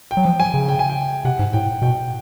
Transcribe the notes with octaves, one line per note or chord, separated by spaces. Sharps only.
G5
F#3
F3
G#5
C#3
G5
G#5
G5
C3 F#5
G#2
A2 G5
B2 G5